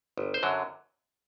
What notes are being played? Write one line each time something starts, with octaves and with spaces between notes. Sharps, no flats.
G1
C5
F#2 D3 F#3